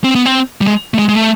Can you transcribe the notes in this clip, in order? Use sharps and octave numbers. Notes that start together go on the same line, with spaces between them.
C4
B3
C4
G3
G#3
A3
G#3
G#3
A3